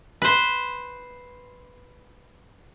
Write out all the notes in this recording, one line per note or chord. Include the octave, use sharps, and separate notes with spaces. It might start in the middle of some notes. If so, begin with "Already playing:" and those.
B4 C5